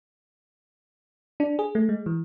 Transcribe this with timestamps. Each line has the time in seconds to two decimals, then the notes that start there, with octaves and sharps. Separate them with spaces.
1.40 D4
1.59 G#4
1.75 A3
1.89 G#3
2.06 E3